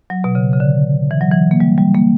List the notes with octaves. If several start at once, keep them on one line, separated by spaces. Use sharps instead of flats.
F#3
B2
C#3
C#3
D3
E3
F#3
E3
A#3
G3
G3
A#3